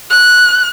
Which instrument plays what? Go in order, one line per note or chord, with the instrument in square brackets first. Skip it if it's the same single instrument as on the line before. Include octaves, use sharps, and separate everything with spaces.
[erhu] F#6